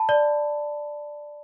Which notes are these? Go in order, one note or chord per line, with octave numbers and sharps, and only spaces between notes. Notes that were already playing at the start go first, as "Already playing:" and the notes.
Already playing: A5 B5
D5